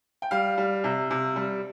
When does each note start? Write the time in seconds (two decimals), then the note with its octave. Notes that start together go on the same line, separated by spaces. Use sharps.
0.22 G5
0.31 G3 F5
0.58 G3
0.84 C3
1.10 C3
1.36 G3